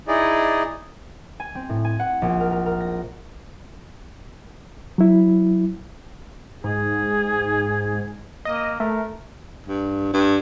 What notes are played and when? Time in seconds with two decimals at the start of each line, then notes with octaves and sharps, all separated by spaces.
0.08 D#4 E4 G#4 D5 D#5
1.40 G#5
1.55 C4
1.69 A2
1.85 G#5
2.00 F#5
2.22 A#1
2.40 A#4
2.52 A#4
2.66 A#4
2.80 A#6
4.98 F#3 E4
6.64 G#2 G#4
8.45 A#3 D#5
8.80 A3 A#4
9.67 G2
10.13 G2